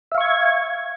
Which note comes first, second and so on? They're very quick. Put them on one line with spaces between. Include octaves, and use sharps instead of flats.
E5 F5 C#6 G#6